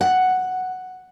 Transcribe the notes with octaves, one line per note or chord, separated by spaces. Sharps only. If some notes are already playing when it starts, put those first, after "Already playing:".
F#5